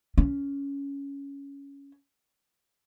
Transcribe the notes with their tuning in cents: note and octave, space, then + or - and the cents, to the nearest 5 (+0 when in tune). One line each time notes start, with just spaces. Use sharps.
C#4 +10